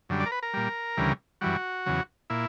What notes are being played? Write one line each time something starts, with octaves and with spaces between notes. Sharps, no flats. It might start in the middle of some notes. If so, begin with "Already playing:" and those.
F#2 D3 G3
D5
A#4
B4
A#4
A#2 G3
D2 C#3 E3 G3
F#2 E3 G3 F#4
E2 C#3 F#3
A#2 E4